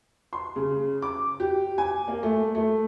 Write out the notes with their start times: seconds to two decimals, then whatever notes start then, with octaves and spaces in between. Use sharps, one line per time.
0.33 C6
0.56 C#3
1.02 D6
1.40 G4
1.78 G#5
2.08 A#3
2.23 A3
2.55 A3